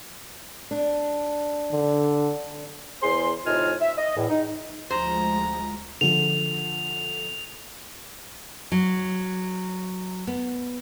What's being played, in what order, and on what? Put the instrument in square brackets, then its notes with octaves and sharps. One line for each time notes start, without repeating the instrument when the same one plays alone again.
[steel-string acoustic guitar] D4
[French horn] D3
[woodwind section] E2 G#4 C5 C6
A2 C3 D#4 F4 G#5 F6
E5
D#5
E2 A2
D#4
[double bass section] D2 F3 G#3 [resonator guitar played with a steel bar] C5 [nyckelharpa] A#5
[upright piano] D3 F3 [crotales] F7
[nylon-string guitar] F#3
B3